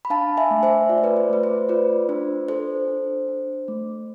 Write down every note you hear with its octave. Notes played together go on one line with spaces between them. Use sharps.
B5
D4 F5 A5
E5 G#5
A3
C5 E5
F4 D5
C5
B4 D5
C5
A3 B4
C5
F4 B4 D5
D4 C5
A4 C5
D4
D4
A3